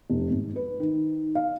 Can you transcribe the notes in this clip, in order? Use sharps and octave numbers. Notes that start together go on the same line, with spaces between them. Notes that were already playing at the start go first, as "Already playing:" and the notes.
F1
G#1
B4
D#3
F5